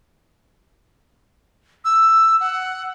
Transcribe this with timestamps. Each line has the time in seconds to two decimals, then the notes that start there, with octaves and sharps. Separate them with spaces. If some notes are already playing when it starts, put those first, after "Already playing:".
1.85 E6
2.41 F#5